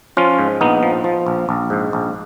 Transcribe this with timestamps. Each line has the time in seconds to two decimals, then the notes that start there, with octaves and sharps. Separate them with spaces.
0.17 F3 C#4 F4
0.39 G#2
0.61 A#1 B3 D#4
0.83 F3
1.04 F3
1.26 A#1
1.49 A#1
1.70 G#2
1.93 A#1